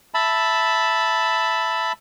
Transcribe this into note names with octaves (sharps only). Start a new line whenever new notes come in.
E5 A5 B5